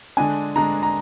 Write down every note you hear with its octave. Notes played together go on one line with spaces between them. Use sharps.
D3 G#3 D4 G#5
D3 G#3 D4 A#5
A#5